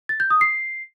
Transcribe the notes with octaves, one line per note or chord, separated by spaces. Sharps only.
A6
G6
D#6
C7